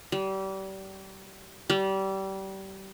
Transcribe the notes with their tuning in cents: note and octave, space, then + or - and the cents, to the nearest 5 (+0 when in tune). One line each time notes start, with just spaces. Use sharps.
G3 -30
G3 -25